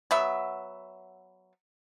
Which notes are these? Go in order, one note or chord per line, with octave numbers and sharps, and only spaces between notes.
F#3 B3 E5